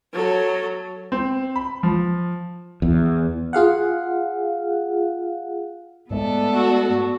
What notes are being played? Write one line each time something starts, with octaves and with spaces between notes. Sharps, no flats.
F#3 A4
C4
B5
F3
E2
F4 G#4 F5 F#5
G#2 G#3 A3 B3 A4 D5
F#4